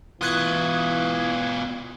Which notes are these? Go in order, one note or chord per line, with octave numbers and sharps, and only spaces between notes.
B2 E3 F4 D#6 F#6 G#6